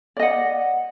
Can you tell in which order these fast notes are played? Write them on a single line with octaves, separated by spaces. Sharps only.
D5 D#5 F#5